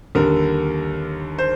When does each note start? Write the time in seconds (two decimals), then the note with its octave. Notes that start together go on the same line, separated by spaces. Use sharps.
0.15 D#2 D3 G3 A#4
1.39 C5